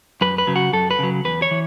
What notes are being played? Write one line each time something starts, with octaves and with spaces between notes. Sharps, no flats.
F#2 B4
B4
C#3 F#3
F#4
F#2 A4
B4
C#3 F#3
E2 B4
C#5
E3